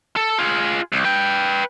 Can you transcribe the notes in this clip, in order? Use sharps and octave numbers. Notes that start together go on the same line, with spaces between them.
A4
F4 G#4
C2
B4 G5